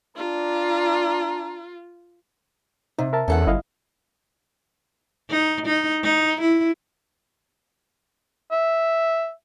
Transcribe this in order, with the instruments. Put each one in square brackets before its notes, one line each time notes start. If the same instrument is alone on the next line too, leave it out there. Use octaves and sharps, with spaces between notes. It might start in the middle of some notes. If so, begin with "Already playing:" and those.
[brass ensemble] D4 A#5 [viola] F4
[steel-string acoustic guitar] C3 [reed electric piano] D#4
[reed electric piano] A#4 E5 A5
[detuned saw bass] E2 [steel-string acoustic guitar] C#4 A4 F#5
[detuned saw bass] G1 [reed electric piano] E4 D#5 F5
[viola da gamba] D#4
D#4
D#4
E4
[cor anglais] E5